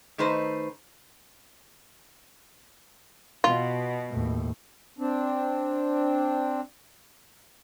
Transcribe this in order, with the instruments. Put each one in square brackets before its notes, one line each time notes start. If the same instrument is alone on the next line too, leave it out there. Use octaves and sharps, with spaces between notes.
[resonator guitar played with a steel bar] D#3 A3 D#4 B4 C5
[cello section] B2 [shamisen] F4
[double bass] D#2 A2
[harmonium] C4 D4